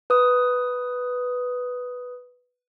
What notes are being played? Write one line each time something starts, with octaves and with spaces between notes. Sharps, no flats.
B4 D#6